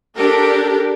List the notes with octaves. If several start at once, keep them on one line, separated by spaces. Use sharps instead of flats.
D4 G4 A4 A#4